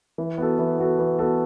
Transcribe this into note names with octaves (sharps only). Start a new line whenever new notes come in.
E3
B3 F#4 A4
E3
B3 F#4 A4
E3
B3 F#4 A4